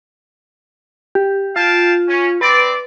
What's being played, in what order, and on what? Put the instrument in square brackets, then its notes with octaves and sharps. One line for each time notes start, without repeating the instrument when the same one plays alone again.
[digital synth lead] G4
[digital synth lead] F4 [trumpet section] F5 G5 A5
[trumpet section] C#4
[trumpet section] C4 D5 [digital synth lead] B4